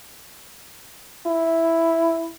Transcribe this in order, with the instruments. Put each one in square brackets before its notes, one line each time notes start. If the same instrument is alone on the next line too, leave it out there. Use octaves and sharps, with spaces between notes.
[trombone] E4